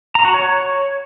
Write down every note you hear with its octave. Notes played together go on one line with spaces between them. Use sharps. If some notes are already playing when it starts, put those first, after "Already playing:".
A#5
F#4
C#5